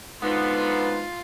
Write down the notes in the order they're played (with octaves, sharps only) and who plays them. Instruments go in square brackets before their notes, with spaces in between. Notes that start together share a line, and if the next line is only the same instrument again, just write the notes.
[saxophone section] B2 D3 B3 [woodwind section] F3 G#3 D#4 [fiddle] F4 [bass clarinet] B4